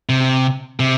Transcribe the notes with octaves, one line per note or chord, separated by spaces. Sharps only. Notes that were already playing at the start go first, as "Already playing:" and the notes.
C3
C3